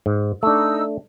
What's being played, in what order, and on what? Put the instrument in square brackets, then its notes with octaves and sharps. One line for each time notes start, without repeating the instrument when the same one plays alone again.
[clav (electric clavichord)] G#2
[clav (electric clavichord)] A3 D4 [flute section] D#4 E6